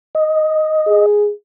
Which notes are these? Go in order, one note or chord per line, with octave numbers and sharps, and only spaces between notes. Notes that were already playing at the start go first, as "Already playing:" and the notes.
D#5
G#4